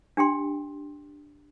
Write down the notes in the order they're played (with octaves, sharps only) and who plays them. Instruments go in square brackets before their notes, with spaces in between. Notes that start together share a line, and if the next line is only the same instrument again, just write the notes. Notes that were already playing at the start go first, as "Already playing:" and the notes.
[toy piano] D4 G4 G5 C6